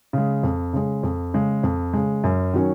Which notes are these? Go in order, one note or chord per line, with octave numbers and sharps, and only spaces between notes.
C#3 G#3
F2
C#3 G#3
F2
C#3 G#3
F2
C#3 G#3
F#2
D#3 F#3 C#4